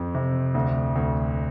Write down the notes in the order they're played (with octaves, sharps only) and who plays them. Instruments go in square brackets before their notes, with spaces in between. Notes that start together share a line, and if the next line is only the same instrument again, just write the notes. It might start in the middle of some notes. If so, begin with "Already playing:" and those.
Already playing: [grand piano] F2 C4
C3
D2
D2